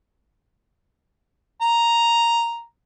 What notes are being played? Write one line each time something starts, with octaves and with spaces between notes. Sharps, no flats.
A#5